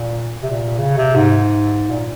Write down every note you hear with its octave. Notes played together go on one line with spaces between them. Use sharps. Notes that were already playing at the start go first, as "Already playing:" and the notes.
Already playing: A#2
C3
A#2
C#3
C3
G#2
A#2